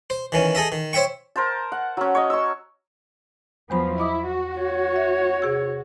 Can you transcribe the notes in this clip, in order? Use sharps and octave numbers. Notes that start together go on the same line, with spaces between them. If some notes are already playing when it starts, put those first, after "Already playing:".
C5
D#3 E3 C#4
G#4 A4 D#5 E5
D#3
C5 C#5 E5 G5 C#6
A#4 C5 A5
F#5
F#3 C#4
C#5 D#5
C#6 E6
E2 F3 F#3 B3 C5 B5
E4 D#5 D6 D#6
F#4
C#5
E5
C3 G#4 E6